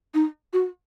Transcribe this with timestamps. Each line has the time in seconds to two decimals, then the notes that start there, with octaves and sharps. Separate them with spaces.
0.14 D#4
0.53 F#4